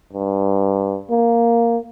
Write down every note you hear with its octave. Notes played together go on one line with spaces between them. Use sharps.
G2
A#3